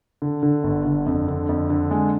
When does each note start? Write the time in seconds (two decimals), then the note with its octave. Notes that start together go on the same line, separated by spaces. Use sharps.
0.22 D3
0.43 D3
0.64 G1
0.85 D3
1.06 F2
1.28 D3
1.49 F2
1.70 D3
1.91 G#3